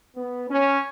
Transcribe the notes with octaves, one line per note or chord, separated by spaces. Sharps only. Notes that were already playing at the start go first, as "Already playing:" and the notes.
B3
C#4